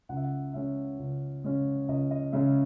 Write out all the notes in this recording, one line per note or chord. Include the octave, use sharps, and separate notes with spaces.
C#2 F#5
E5
F#5
C#3 G#3 C#4 E5
C#2
C#3 G#3 C#4
C#2 D#5
D#5
C#3 G#3 C#4 E5